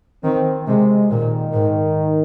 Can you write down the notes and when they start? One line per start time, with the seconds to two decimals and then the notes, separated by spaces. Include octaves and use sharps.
0.23 D#3 C4
0.66 C3 G#3
1.10 A#2 D#3
1.53 G#2